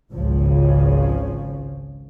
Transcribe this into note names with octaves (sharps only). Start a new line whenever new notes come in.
G#1 C#2 C#3 F3